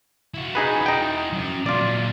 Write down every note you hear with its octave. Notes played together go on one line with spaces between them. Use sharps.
E4 F#4
D#4 G#4 B4
D#4 G5
F#3 C#4
A#2 F#3 F4 D5